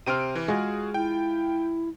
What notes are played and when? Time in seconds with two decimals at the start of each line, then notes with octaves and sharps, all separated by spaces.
0.06 C3 C4 C6 F6 D7 D#7
0.35 E3
0.48 G#3 F4 F#4 G#4
0.94 E4 G5